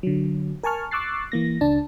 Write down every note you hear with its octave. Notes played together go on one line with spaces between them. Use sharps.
D3 F#3
A#4 G#5 A5 C#6 F6
C#6 D6 E6 F#6 A6 C7
E3 A#3 A#6
C#2 D4 A5